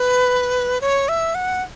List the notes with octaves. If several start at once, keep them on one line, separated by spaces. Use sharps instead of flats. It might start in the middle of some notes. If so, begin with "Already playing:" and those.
Already playing: B4
C#5
E5
F#5